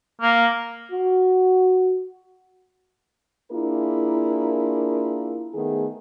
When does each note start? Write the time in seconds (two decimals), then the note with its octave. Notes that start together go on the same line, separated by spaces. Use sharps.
0.21 A#3
0.92 F#4
3.51 A#3 D4 E4 F4 G#4 A#4
5.54 D#3 A3 B3 G#4